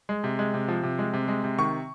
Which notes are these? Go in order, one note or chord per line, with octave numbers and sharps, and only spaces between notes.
G#3
C3
G#3
C3
F3
C3
G#3
C3
G#3
C3
D#3 C#6